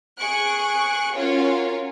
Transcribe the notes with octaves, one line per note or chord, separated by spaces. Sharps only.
G#4 C#6 F#6 D7
C#4 F4 F#4 A#4 C#5